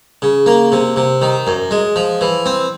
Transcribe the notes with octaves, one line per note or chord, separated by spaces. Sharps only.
C#3
A#3
C3
C3
D#3
F#2
G#3
F3
E3
C4